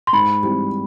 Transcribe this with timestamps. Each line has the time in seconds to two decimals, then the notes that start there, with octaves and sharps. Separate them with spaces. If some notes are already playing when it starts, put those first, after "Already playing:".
0.07 C6
0.13 G#2 B5
0.43 E3 G3 C4